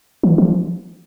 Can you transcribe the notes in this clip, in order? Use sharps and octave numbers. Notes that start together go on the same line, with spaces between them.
E3
F3